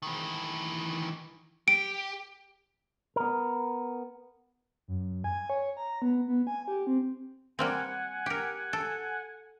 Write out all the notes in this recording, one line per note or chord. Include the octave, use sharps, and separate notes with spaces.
D#3 E3
G4 D7
B3 A#4
F#2
G#5
C#5
A#5
B3
B3
G#5
G4
C4
G3 A#3 C4 F#5 G#5
G4 A#4
A4